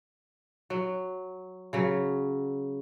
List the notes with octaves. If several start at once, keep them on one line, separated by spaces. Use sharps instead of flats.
F#3
C#3 F#3